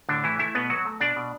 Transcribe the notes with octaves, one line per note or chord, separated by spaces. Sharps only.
A2 D3 D4
E3 A3 E4
A3 E4 E5
B2 B3 B4
F#3 F#4
A3
B2 D4 D5
B2